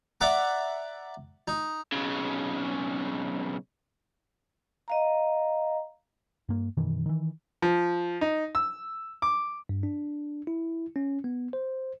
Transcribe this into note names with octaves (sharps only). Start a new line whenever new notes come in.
D5 E5 F#5 A#5 D6
D#4
B1 C#3
D#5 F5 A#5
G2 A#3
F#2 B2 D#3 E3
D#3 E3
F3
D#4
E6
D6
G2
D4
E4
C#4
B3
C5